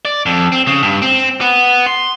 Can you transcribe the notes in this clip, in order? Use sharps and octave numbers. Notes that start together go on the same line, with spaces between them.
D5
F2
C4
C#3
G2
C4
B3
C6